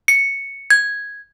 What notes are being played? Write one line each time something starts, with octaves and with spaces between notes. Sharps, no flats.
C#7
G#6